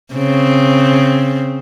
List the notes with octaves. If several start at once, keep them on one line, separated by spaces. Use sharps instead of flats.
C#3 C4